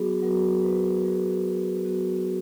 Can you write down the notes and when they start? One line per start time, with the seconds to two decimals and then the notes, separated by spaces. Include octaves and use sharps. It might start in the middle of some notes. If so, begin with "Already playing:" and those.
Already playing: F#3 B3 F#4 G#4
0.22 F#3 B3 F#4 A#4
0.63 B4
1.04 F#3 B3 F#4 G#4
1.85 F#3 B3 F#4